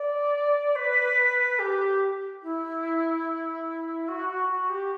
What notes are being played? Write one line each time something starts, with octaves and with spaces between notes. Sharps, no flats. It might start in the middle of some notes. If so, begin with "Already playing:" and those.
Already playing: D5
B4
G4
E4
F#4
F#4
F#4
G4